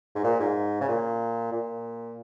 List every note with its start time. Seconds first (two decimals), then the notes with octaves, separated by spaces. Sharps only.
0.15 G#2
0.24 A#2
0.40 G#2
0.80 C#3
0.88 A#2
1.52 A#2